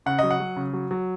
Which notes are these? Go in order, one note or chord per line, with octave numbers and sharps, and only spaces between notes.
C#3 F#5
F#3 D#5
F#5
F#3
C#3
F#3
F#3